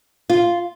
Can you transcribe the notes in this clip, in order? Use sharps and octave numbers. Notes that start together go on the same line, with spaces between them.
F4